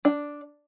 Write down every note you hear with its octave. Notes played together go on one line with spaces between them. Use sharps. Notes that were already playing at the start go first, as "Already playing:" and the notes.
D4